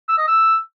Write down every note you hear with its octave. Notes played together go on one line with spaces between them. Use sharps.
E6
D#5
E6